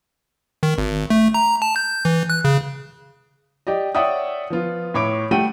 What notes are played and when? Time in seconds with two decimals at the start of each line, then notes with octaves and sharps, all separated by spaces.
0.63 D#3
0.78 G#1
1.10 A3
1.34 A#5
1.62 A5
1.76 G6
2.05 E3
2.30 F#6
2.44 C#3
3.67 G4 D5 D#5
3.95 C#5 D5 E5 F#5 G5 D#6
4.50 F3 B3 F4
4.94 A2 C#5 D6 D7
5.31 G3 A3 F#5 G5 D#7